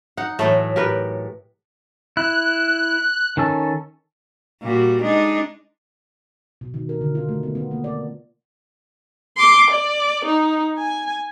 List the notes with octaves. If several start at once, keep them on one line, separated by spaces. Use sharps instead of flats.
D#4 F#5
A2 E3 F#3 A3
G4 A#4 B4
E4 F#6
D#3 C#4 A4
A#2 G3 F#4
G#3 D4 D#4
B2
D#3
A#4
D3
F4
A3
B3
B3
A#3
D5
C6 D6
D5
D#4
G#5